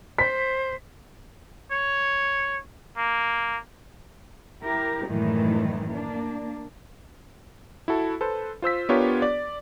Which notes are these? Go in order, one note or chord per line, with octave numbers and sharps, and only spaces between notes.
C5 B6
C#5
A#3
E4 G4 A#4
F#2 A2 D#3 E3 G3 G#3
A#3 D4
E4 F#4 A4
A4 B4 C5
F4 C5 E6 B6
B3 D4 F4 G4 A#4 C#5
D5